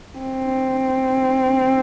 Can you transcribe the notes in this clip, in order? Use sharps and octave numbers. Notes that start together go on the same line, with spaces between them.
C4